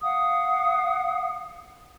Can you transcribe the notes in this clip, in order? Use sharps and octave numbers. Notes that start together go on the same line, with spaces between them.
F5 F#5 D#6